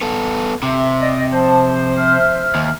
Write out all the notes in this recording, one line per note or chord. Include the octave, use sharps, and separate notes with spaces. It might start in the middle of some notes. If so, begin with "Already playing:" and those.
B3 A4
C3 E5
D5 D#5
F3 C5 A5
E5 F6
D#2